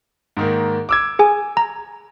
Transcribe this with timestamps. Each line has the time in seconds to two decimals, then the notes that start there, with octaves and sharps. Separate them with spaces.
0.37 G#2 D#3 A#3
0.89 D6 E6 G#6
1.19 G#4 G#5
1.57 A#5